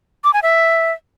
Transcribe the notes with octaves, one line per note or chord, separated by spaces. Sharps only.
D6
G#5
E5